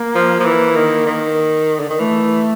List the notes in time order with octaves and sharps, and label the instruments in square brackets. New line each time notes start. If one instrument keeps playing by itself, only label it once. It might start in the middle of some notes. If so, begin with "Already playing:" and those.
Already playing: [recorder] A#3
[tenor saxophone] F3
F3
E3
D#3
D#3
D3
D#3
[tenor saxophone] E3 [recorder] A3